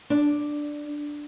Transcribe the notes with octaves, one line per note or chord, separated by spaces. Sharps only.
D4